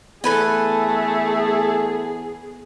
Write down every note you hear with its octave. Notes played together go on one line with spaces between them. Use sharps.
E2 A3 G#4 A4 B4 G#5